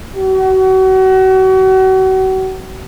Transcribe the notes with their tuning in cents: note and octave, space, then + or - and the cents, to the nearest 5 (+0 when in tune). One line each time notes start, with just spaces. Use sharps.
F#4 +35